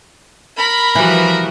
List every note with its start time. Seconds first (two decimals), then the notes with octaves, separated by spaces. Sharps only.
0.58 A#4 B5
0.95 E3 F3 G3 F#4